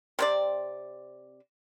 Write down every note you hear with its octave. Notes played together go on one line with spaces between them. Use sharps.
C3 C4 D5